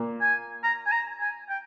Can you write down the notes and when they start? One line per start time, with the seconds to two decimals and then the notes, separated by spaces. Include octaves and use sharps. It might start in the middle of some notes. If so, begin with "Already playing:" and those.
Already playing: A#2 A#3
0.21 G#5
0.63 A#5
0.86 G#5
0.92 A#5
1.20 G#5
1.49 G5